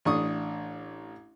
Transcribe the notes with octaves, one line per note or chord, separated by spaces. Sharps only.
A1 D4 C#6 D#6